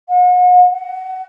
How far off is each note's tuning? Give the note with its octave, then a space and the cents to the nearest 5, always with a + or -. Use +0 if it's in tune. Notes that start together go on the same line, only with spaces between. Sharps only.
F#5 -40
F#5 +20